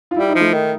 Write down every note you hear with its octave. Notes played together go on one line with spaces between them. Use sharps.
F4
G3 E4
D#4
F3
A3
D#3